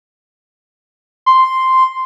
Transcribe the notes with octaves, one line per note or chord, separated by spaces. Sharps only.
C6